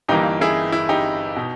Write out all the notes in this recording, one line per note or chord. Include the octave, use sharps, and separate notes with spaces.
G1 G2 E3 A#3 D#4 G4
E4 G#4
E4
D#4 G4
B2